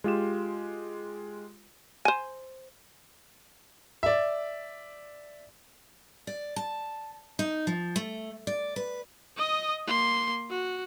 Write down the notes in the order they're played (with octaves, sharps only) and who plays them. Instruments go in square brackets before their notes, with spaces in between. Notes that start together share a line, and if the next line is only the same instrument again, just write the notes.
[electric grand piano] G#3 F4 G4 E7
[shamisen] C5 G#5
[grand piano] D5 E5
[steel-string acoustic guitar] D5
A5
D#4
F3
A3
D5
B4
[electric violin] D#5 D#6
A#3 C6
F#4